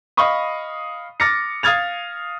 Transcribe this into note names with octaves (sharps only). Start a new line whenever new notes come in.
D#5 F5 B5 C#6 D#6
D6 F6 A6 A#6 C#7
F5 D#6 F6 G#6 A6 F7